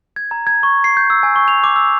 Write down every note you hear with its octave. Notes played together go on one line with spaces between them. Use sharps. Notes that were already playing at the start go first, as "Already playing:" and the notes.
G#6
A#5
G#6
C#6
C7
G6
E6
G#5
C#6
F7
D6
E6